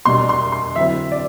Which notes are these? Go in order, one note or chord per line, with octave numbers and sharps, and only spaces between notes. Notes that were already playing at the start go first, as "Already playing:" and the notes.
B2 G3 D4 C6
C6
C6
D3 F#3 C4 E4 E5
D5